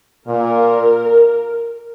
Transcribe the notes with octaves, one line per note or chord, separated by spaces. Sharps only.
A#2 A#4